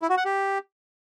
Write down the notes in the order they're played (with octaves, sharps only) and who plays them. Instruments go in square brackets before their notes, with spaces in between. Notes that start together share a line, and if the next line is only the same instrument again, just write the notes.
[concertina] E4
F#4
F#5
G4